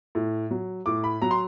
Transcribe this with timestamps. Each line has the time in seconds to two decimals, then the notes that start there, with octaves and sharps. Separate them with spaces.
0.15 A2
0.51 F#3
0.86 A2 D6
1.04 B5
1.22 F#3 A#5
1.31 C6